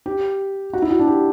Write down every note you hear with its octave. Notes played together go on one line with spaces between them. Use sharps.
G4
F#4
E4
F#4
D4
G4